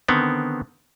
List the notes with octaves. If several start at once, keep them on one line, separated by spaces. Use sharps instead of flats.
D3 D#3 B3 C4